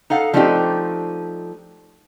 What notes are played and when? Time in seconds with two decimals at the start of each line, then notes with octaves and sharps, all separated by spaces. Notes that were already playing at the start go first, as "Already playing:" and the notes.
0.10 D#4 A4 F5 F#5
0.34 F3 A3 C4 D4 D#4 G4